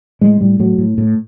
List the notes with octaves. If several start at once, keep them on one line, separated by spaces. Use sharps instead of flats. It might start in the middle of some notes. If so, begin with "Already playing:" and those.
A2 G#3
A2 G3
A2 F#3
A2
A2